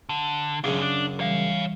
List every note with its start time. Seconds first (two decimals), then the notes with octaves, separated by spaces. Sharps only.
0.09 D3
0.64 F#2 C#3 D4 G#4
0.81 D4
1.20 E3 G3 C#5 F5